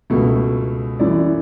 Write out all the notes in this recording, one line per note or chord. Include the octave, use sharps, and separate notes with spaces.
C#2 B2 A3
F#2 E3 A3 D5